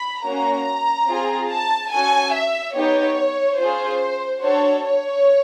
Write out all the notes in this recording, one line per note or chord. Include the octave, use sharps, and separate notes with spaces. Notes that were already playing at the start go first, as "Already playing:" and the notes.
Already playing: B5
A#3 C#4 F#4 A#5
C4 F4 G#4
A5
C#4 F#4 A4 G#5
E5
B3 D#4 G4 C#5
C#4 F4 G#4 C5
D4 F#4 A4 C#5
C#5